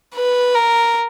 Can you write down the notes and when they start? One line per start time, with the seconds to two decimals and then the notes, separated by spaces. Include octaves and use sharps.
0.15 B4
0.55 A#4